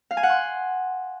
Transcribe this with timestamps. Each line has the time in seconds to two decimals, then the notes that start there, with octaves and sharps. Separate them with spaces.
0.11 F5
0.17 G#5
0.23 F#5
0.29 C6